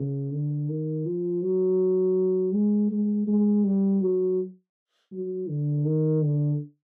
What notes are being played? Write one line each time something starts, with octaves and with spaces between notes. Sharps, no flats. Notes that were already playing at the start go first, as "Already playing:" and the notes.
Already playing: C#3
D3
D#3
F3
F#3
G#3
G#3
G#3
G3
F#3
F#3
D3
D#3
D3